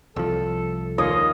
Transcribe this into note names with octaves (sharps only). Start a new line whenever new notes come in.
C2 F3 A4
D#2 F4 C#5 D#5 F6